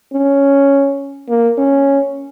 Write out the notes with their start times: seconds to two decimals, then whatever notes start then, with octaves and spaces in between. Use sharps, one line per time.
0.13 C#4
1.29 A#3
1.58 C#4